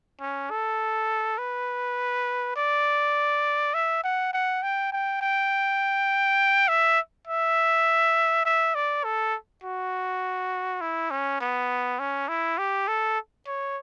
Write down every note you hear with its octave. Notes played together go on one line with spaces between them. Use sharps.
C#4
A4
B4
D5
E5
F#5
F#5
G5
G5
G5
E5
E5
E5
D5
A4
F#4
E4
C#4
B3
C#4
E4
G4
A4
C#5